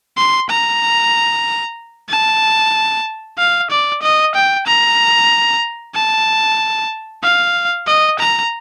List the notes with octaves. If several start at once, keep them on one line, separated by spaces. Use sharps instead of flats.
C6
A#5
A5
F5
D5
D#5
G5
A#5
A5
F5
D#5
A#5